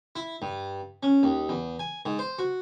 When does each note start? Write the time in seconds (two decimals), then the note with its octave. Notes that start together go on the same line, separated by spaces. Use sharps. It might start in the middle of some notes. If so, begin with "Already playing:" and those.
0.16 E4
0.42 G2
1.03 C#4
1.23 D#2
1.49 E2
1.79 G#5
2.05 G#2
2.19 C5
2.38 F#4